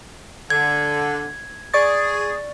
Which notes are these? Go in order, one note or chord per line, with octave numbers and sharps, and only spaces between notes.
D3 G#6
G#4 D5 C#6 A6